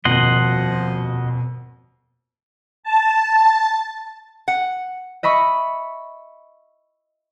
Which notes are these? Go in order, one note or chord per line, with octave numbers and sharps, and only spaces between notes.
D#1 F2 B2 F3 D#5 F#5 C6
A5
F#5
D#5 E5 B5 C#6